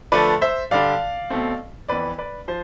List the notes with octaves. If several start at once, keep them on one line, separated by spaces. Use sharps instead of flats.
D3 F3 A3 B4 D5
C5 E5
G2 D3 G3 D5 F5
B2 A3 C4
F2 E3 B3 B4 D5
B4 D5
F3 C5